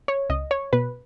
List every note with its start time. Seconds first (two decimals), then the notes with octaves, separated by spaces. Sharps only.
0.08 C#5
0.29 C#2 D#5
0.51 C#5
0.73 B2 B4